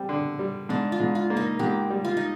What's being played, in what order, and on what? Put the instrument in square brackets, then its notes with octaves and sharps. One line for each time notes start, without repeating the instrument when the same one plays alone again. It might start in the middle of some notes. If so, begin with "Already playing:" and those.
Already playing: [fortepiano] G3 [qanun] C4
[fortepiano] D3
G3
[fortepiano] G#2 [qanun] D4
[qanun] F4
[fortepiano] G#2
[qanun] F4
[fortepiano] A#3
[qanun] D#4
[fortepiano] G#2 [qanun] G4
[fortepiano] G3
[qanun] F4
D#4